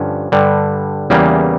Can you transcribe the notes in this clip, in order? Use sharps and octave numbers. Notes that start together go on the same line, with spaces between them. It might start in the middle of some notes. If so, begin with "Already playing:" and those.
Already playing: G2 D3 F3 C#4
G2 D3 G3
E2 C#3 E3 G3 A#3